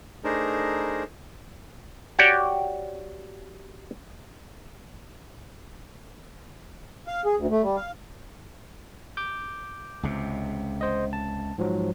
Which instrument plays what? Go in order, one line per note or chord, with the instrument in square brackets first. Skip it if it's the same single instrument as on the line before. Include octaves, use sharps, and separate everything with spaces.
[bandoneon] A3 D4 D#4 G#4 A#4 C5
[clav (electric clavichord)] F#4 G4 C#5 D5 G5
[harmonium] F5
G#4
D2
A3
G3
F5
[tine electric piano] D6 G6
[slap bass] C#2 C3
[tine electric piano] C5 D#5
A5
G#2 F3 F#3